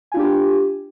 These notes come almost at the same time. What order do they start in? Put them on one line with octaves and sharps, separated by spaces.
G#5 F4 D4 G4